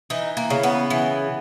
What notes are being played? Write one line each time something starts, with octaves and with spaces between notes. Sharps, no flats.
E3 D#4
A#3
C#3
B3
E3